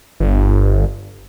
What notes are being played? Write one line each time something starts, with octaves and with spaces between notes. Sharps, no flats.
G1